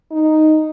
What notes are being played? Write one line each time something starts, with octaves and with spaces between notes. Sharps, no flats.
D#4